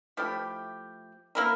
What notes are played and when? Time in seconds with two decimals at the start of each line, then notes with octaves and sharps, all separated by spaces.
0.17 F3 A3 E4 G4
1.35 A#3 E4 A#4